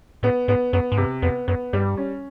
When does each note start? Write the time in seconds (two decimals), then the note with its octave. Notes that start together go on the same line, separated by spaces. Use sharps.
0.23 A2 B3
0.48 G#2 B3
0.73 F#2 B3
0.92 G#2
0.97 G2 C3
1.22 F2 B3
1.48 F#2 B3
1.73 G2 G3
1.97 C#4